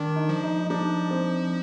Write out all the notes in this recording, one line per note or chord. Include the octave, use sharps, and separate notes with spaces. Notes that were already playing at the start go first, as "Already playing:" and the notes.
Already playing: D#3 D4
D#4
F3
D#4
D#4
F3 D4
C4